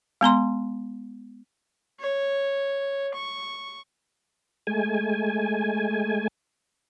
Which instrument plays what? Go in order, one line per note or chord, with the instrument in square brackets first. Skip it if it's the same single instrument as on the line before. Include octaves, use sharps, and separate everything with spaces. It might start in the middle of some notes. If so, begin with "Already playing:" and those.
[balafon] G#3 B3 A#5 C6
[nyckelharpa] C#5
C#6
[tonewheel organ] G#3 A3 G#5